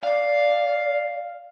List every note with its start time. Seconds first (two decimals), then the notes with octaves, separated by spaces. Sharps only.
0.03 D5 F5